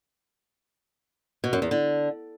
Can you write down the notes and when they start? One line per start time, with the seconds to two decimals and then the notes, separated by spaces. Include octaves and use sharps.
1.44 B2
1.53 F#2
1.62 E2
1.71 D3